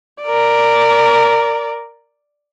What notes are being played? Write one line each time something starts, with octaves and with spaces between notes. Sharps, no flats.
A#4 D5